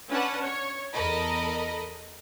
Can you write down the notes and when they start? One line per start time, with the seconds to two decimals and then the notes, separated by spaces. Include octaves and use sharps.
0.11 C#4 D4 B4 F#5 A5
0.43 C#5
0.93 E2 A4 A#4 D#5 B5